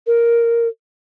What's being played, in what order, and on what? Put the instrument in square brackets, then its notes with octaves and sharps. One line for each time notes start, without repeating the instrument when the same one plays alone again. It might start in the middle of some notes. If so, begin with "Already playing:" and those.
[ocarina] A#4